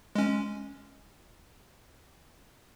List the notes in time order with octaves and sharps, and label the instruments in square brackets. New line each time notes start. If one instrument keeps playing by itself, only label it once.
[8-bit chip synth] G#3 C#4